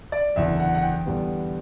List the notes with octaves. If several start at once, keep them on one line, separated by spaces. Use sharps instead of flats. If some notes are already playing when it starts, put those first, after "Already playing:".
D5
F#1 E2 D3 E5
F#5
F#5
G5
E2 D3 G3 B3